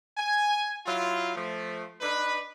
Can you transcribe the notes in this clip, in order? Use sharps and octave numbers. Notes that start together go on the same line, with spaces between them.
G#5
F#3 E4 F4
F3 A3
D4 D#4 B4